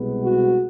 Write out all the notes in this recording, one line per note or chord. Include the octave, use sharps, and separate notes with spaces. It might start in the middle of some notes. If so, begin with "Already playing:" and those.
Already playing: C2 B2 G#3 B3
F#4